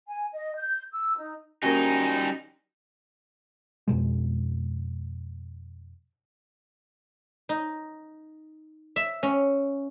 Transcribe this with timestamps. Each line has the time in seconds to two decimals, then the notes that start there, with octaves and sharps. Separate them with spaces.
0.08 G#5
0.33 D#5
0.56 G6
0.93 E6
1.17 D#4
1.63 F3 G3 A#3 C#4 D#4 F#4 G4 G#5
3.88 F2 B2 G#3
7.49 D#4
8.96 E5
9.23 C#4